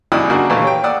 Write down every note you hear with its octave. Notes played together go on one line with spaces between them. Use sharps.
B1 C#3 G#3 E4 D5 D#6
C#3 A#3 D4 F4 F#4 A#4
A#2 D#3 E3 G3 A3 A#3
C#5 G5
A#3 D5 F#5 D#6 E6